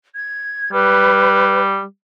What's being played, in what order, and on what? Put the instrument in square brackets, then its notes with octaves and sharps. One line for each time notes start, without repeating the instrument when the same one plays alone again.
[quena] G#6
[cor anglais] G3 [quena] B4